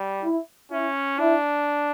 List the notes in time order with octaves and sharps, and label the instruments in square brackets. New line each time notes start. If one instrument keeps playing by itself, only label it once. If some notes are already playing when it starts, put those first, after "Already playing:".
Already playing: [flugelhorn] G3
[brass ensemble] E4
[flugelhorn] C#4 [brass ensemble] E4
[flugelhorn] D4 [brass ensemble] E4